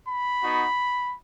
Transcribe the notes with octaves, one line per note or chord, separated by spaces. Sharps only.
B5
B3 D#4 F#4